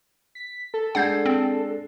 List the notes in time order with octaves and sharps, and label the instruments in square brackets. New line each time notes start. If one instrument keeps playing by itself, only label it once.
[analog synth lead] B6
A4
[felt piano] G#3 D4 C7 [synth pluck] F#5 G6 G#6
[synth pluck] C4